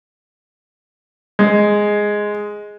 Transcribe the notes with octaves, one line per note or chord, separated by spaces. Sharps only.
G#3